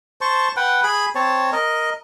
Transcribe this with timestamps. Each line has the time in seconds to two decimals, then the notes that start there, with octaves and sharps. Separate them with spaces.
0.21 C5 A5 C#6
0.57 B4 F#5 G5
0.84 G#4 B5
1.15 C4 C#5 A5
1.52 A#4 D#5